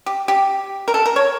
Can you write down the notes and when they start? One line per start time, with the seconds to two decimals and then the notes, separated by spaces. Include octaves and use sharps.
0.06 G4
0.28 G4
0.88 A#4
0.94 A4
1.06 A#4
1.16 C#5